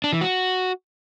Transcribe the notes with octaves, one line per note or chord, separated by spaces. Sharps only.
D4
E3
F#4